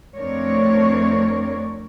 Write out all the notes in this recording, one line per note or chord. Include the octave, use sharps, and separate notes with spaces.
F2 A3 C4 D4 A#4 C#5